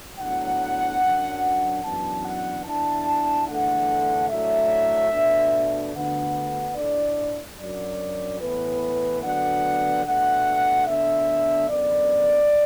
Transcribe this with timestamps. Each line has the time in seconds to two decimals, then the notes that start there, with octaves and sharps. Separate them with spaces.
0.19 A2 F#3 B3 D4 F#5
1.01 F#2 F#3 D4
1.83 F#2 E3 B3 D4 A5
2.24 F#5
2.65 E2 E3 D4 A5
3.48 E2 D3 A3 D4 F#5
4.29 A2 F#3 A3 D4 E5
5.12 B2 A3 D4
5.94 D2 D3 B3 D4 F#5
6.76 A2 A3 D4 D5
7.58 F#2 F#3 D4 D5
8.40 A2 E3 B3 B4
9.22 D2 D3 F#3 B3 D4 F#5
10.04 B2 A3 D4 F#5
10.86 D2 D3 B3 D4 E5
11.69 F#2 D3 B3 D5